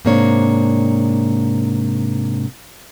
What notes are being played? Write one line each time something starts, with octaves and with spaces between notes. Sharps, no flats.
G#2 C3 A#3 D4 C#5